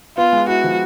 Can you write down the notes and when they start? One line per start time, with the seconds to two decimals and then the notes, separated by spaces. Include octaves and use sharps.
0.17 B3 F4
0.33 G#3
0.48 E4 F#4
0.64 F3